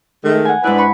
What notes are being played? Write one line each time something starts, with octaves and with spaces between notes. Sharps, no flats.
D#3 G#3 A3
F#5 G#5
G#2 D4 E4 B4
B5 C#6